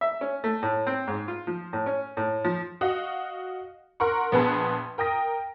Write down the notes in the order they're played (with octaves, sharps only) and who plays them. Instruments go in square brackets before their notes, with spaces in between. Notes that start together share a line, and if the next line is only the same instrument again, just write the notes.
[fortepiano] E5
C#4
A3
A2
C4
G#2
F4
F3
A2
C#4
A2
F3
[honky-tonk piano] F#4 D#5 F5
A#4 F#5 C6 C#6
A#1 B3 G#4 B4 A5 C6
A#4 G5 D#6 A#6